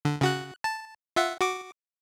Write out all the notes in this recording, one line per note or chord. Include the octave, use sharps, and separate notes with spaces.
D3
C#3 F#4 F#6
A5
F4 E5 F#5
F#4 D6